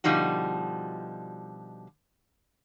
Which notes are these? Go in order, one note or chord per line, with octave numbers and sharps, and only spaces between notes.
B2 D3 F3 G3 D#4 F#4